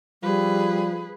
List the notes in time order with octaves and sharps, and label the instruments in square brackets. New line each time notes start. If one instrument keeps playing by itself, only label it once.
[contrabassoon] F3 [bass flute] G3 [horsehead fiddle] G#4 B4